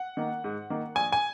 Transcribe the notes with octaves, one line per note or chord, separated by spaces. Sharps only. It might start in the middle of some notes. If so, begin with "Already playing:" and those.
Already playing: F#5
D#3 A#3
G#2
D#3 A#3
A#1 G#5
G#5